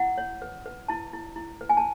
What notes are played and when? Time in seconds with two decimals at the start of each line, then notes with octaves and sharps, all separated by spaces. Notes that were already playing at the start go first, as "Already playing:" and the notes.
Already playing: E4 F#5
0.18 C#5
0.42 B4
0.66 B4
0.88 E4 A5
1.13 E4
1.36 E4
1.61 B4
1.69 G#5
1.77 A5